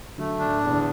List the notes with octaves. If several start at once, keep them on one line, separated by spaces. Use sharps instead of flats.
D3 F#3 A3
D4
A2
E2
B2
A2 D3